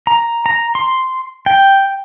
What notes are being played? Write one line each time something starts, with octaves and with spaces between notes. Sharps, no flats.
A#5
A#5
C6
G5